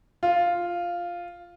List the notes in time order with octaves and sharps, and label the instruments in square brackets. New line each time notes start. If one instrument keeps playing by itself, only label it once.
[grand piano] F4